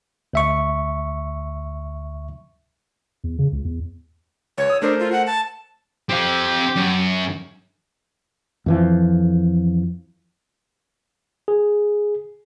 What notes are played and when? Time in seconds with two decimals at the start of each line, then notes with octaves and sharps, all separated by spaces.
0.33 D2 E5 C#6
3.24 E2
3.39 C#3
3.52 C#2
3.65 E2
4.58 C#2 C#5
4.70 D#6 E6
4.82 A3 D4 A#4 C5
5.00 F4
5.12 F#5
5.27 A5
6.10 C4 G4 F5
6.76 F#2
8.66 F2 E3 F3
11.48 G#4